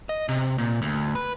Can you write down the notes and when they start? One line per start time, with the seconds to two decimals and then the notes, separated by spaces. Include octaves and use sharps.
0.09 D#5
0.29 C3
0.58 A#2
0.82 D2
1.15 B4